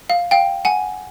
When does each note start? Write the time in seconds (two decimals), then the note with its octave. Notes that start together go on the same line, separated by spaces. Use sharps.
0.10 F5
0.31 F5 G5
0.65 F#5 G#5